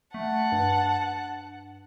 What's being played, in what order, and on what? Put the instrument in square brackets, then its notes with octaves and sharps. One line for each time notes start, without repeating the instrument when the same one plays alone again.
[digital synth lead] A3 [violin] F#5 A5
[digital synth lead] G2